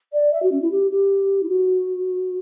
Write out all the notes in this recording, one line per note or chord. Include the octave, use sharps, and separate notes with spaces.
D5
E5
F#4
C#4
E4
G4
G4
E4
F#4